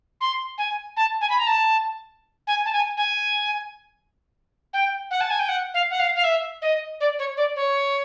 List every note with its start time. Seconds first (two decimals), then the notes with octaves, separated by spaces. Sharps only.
0.21 C6
0.58 G#5
0.97 A5
1.21 G#5
1.30 B5
1.39 A#5
1.47 A5
2.47 G#5
2.65 A5
2.73 G#5
2.97 G#5
4.73 G5
5.11 F#5
5.21 A5
5.30 G#5
5.39 G5
5.49 F#5
5.74 F5
5.91 F#5
5.99 F5
6.16 F5
6.24 E5
6.62 D#5
7.00 D5
7.19 C#5
7.37 D5
7.56 C#5